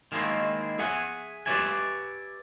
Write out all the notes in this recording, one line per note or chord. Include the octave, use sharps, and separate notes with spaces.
D#3 G#3 A#3 C4 E4
G#4 E5 F#5 G#5
G4 B4 C#5 D5 E5 G#5